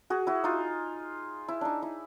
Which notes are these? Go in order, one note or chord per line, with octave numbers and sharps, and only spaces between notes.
F#4 G#4
E4 F#4
D#4 F4
E4
D4 D#4
E4